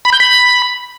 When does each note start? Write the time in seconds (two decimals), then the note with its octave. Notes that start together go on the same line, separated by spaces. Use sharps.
0.05 B5
0.13 G6
0.20 B5